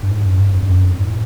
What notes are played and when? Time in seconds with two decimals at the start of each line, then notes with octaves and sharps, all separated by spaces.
0.02 G2
0.10 G#2
0.25 F#2
0.37 G2
0.54 F2
0.63 F#2
0.90 F2
0.99 G#2
1.07 A2